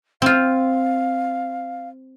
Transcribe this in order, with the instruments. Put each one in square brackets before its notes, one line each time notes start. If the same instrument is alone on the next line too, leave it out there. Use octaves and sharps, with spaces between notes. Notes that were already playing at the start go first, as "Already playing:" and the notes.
[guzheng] C4 F4 [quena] F5